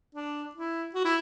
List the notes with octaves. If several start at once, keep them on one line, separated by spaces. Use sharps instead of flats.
D4
E4
F#4
E4